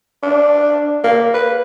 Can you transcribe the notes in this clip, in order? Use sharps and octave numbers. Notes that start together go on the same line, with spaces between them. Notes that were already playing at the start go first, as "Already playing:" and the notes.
D4
A#3
B4